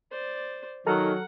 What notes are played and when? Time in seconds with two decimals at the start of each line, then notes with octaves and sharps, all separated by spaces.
0.11 C5 D5
0.87 D#3 F#3 A4 F#5 A#5 F6